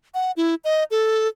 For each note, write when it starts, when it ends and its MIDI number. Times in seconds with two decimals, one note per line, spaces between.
0.14 0.31 78
0.37 0.55 64
0.64 0.84 75
0.91 1.28 69